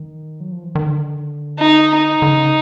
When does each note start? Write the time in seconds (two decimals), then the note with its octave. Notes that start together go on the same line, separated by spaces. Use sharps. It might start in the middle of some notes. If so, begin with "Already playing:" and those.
Already playing: D#3
0.40 F#3
0.52 F3
0.64 E3
0.75 D#3
0.86 D3
1.59 D#4
1.95 D#4
2.22 D3
2.31 C#3